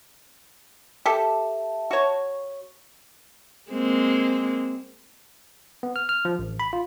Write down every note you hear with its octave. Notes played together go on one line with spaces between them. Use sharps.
G4 A4 E5 A5
F#4 C#5
G#3 A#3 C4
B3
F6
F6
F3
A1
B5
F4